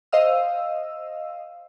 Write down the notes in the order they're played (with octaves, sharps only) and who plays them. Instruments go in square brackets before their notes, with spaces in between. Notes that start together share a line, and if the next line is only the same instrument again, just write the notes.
[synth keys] C5 D#5 F5 E6